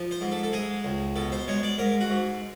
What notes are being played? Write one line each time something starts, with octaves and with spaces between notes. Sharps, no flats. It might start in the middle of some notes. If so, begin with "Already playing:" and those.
Already playing: F3
C5
G#2
A4
A4
G#3 G#4
C#2
B2 A4
C5
G#3 C#5
D5
G#2 A#4
F#4
G#2